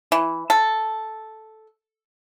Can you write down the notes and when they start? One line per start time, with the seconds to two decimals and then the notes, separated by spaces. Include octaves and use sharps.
0.12 E3
0.50 A4